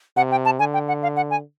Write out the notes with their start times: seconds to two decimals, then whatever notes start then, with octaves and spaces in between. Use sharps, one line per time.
0.17 C3 F#5
0.31 G5
0.45 A5
0.59 D3 G#5
0.74 G5
0.88 F#5
1.03 F5
1.16 F#5
1.31 G#5